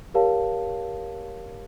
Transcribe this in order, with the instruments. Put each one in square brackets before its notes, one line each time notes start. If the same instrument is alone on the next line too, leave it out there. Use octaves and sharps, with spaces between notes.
[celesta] G4 A#4 C#5 F5 A5